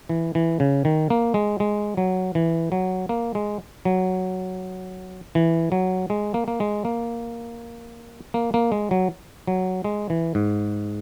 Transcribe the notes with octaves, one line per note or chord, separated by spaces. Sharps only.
E3
E3
C#3
D#3
A#3
G#3
G#3
F#3
E3
F#3
A#3
G#3
F#3
E3
F#3
G#3
A#3
A#3
G#3
A#3
A#3
A#3
G#3
F#3
F#3
G#3
E3
G#2